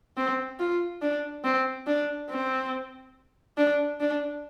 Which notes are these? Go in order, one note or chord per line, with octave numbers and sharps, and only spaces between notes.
C4
F4
D4
C4
D4
C4
D4
D4